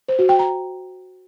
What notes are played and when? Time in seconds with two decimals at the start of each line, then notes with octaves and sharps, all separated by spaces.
0.08 C5
0.19 F#4
0.29 G5
0.39 A#5